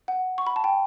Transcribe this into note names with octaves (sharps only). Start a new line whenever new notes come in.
F#5
C#6
B5
A5
G5